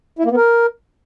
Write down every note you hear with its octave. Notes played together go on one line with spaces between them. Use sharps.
E4
A#3
B3
A#4